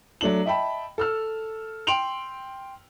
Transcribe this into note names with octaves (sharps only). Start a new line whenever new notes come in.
F#3 A3 D4 F#7
D#5 E5 G5 A5 B5
A4 E6 F6
G5 C6 D7 F7 F#7